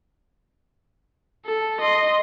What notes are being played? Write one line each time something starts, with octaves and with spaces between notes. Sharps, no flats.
A4
D#5 C6